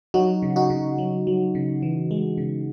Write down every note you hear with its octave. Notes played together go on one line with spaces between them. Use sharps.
F#3 D#4 F#4
C#3
D#4 F#4
C#3
F#3
F#3
C#3
E3
G#3
C#3